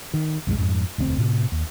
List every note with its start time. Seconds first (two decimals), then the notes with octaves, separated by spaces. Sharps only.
0.14 D#3
0.47 B1 F2 D#3 G#3
0.58 F2 G#2
0.98 E1 D2 A#3 C4
1.18 A2 C3
1.52 D#2